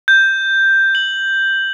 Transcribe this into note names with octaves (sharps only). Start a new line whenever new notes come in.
G6
F#7